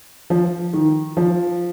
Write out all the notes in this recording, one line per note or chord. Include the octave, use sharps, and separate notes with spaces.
F3
D#3
F3